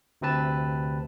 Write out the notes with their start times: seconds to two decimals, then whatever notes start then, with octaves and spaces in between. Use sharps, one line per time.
0.21 D2 C3 C4 B4 A5